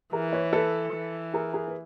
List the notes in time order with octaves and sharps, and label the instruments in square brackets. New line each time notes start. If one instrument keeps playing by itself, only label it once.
[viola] E3 [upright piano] G#4 A#4
[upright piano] B4 C#5
A4 B4
[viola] E3
[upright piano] G#4 A#4
G#4 A#4
B4